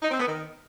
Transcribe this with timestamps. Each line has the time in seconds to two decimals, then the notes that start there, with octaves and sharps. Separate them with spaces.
0.02 D#4
0.11 C4
0.19 B3
0.27 D#3